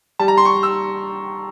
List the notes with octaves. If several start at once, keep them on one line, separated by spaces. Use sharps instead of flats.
G3 A5
A#5
G3 C6
C#6
G3
E6